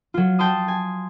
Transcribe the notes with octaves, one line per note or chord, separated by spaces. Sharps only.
F#3 F4
G5 A5 C6 D#6
G#5